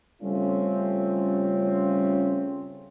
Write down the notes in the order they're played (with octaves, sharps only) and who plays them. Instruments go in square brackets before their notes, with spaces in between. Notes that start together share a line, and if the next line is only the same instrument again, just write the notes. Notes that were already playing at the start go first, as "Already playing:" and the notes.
[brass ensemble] C#3 G3 A3 C4 C#4 F4